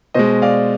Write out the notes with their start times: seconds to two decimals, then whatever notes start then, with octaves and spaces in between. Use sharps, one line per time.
0.14 B2 G#3 C5 D#5
0.42 D5 F5